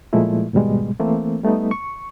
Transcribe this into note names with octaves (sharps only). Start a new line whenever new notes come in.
A#2 F3 G#3 A3 E4
D#2 G#2 B2 G3 G#3
E3 A3 A#3 C4
G3 A3 B3 D#4
C#6